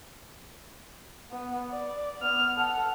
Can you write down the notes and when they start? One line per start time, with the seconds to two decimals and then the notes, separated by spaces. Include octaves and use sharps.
1.31 B3
1.71 D5
2.21 B3 F6
2.56 A4 F#5